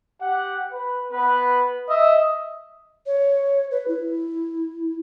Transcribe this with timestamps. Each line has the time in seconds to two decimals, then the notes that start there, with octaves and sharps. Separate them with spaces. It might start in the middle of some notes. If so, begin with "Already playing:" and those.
0.21 G4 F#5
0.72 B4
1.13 B3 B4
1.90 D#5 E5
3.06 C#5
3.71 B4
3.88 E4